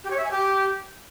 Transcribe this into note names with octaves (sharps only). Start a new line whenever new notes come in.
G4
C#5
E5
G#5
G4